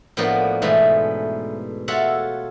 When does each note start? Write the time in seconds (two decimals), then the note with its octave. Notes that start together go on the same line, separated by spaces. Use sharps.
0.17 A2 F3 A#3 B3 D4 F#4
0.62 G#2 B2 E3 A3
1.88 F4 F#4 A4 C#5 E5 F#5